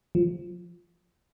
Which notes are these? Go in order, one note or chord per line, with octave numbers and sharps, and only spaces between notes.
F3